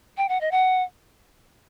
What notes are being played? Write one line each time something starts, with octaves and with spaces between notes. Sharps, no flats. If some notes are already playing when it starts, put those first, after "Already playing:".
G5
F#5
D#5
F#5